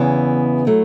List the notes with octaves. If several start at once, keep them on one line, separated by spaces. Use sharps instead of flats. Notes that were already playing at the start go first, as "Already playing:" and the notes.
Already playing: E2 C#3 E3 B3 E4
F#3 A3 E4